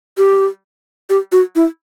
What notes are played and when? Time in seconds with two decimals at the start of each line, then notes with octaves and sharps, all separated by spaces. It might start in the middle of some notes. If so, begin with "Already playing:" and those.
0.18 G4
1.10 G4
1.32 F#4
1.56 E4